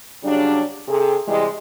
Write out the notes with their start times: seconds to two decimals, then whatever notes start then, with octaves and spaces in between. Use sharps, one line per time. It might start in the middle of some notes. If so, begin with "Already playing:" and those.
0.23 C#3 F#3 G3 D4
0.88 C3 G#4 A4
1.28 C3 E3 G3 G#3